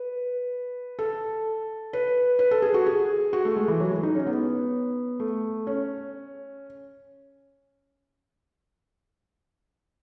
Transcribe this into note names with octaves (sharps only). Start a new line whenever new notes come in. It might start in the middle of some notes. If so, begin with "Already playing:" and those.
Already playing: B4
A4
B4
B4
A4
G#4
F#4
G#4
F#4
A3
G#3
E3
F#3
G#3
D#4
C#4
B3
A3
C#4